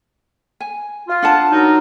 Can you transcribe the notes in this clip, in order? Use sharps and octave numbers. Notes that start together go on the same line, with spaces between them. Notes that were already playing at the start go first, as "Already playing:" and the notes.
G#5
F4
D4 F#5 A5
F#3 D#4 A#4